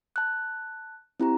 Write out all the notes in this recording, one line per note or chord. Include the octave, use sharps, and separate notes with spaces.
A5 F#6
C4 E4 G4 A#5